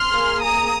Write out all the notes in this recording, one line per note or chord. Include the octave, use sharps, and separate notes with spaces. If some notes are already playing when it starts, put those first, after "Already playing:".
Already playing: C6 F6
A#3 G#4
A#5 D#6